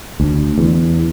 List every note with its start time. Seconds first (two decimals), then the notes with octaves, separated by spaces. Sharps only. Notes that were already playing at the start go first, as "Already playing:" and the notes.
0.20 D2
0.58 E2